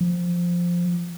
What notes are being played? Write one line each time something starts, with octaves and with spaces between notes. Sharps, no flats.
F3